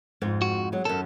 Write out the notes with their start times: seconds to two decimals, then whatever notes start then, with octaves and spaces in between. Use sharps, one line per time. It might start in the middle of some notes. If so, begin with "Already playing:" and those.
0.21 F2 G#2 C4
0.42 F#4
0.72 F#3 G#3
0.85 F#2 D#3 A4